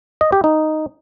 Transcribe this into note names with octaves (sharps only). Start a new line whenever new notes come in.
D#5
G4
D#4